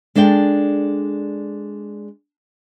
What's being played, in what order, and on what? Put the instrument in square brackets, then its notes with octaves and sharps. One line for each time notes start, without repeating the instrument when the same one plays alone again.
[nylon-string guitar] G#3 D4 A4 D5 G5